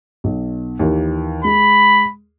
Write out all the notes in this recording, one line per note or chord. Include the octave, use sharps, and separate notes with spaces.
B1
D#2 E3 A#3
G#3 B5